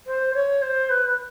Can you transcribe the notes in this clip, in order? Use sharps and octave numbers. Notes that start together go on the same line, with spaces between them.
C5
C#5
C5
B4